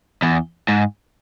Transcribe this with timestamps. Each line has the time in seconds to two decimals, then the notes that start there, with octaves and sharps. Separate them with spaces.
0.22 E2
0.68 G#2